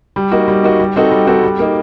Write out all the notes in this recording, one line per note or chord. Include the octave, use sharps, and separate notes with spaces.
G3
A#3 D#4 F#4
G3
A#3 D#4 F#4
G3
C4 D#4 F#4 A4
G3
C4 D#4 F#4 A4
G3
A#3 D#4